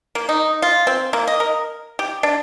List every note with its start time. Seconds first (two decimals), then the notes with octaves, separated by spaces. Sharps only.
0.15 A#3
0.29 D#4
0.62 F4
0.87 C4
1.13 A#3
1.27 D#5
1.40 A#4
1.99 G4
2.23 D4